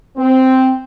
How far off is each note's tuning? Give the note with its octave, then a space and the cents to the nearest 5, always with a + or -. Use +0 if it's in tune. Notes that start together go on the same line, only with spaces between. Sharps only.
C4 -5